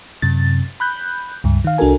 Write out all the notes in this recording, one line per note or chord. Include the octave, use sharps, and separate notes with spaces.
F#2 C3 A6
B5 F#6 G6
C#2 G2
D#3 F5
C2 D4 F#4 A4 A#4 G#5